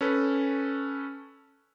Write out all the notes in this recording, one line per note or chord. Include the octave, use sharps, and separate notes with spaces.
C#4 A4 B4